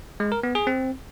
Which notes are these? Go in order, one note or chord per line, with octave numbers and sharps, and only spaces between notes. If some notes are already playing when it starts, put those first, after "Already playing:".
G#3
A#4
B3
G#4
C4